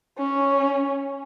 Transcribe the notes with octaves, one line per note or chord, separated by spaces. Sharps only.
C#4